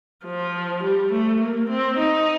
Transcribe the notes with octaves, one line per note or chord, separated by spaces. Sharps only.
F3
G3
A3
A#3
C4
D#4